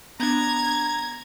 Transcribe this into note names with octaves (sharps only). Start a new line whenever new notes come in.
B3 D4 A#5 G#6